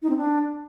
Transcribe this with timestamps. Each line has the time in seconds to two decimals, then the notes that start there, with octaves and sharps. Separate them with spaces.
0.02 D#4
0.10 C4
0.17 D4